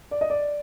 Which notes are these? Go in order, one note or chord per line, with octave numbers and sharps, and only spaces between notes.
D5
D#5
D5